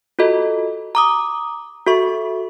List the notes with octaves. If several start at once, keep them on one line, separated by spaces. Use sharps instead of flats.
F4 F#4 A4 D#5
A#5 D6 D#6
F#4 A4 E5 C#6